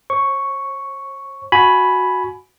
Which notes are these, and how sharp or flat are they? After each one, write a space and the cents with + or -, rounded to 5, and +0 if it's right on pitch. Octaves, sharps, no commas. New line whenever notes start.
C5 +45 C#6 +0
F#4 -5 G#5 +20 B5 +0